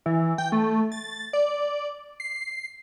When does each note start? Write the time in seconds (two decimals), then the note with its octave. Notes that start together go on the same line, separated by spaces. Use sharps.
0.06 E3
0.38 G5
0.52 A3
0.92 A6
1.33 D5
2.20 C7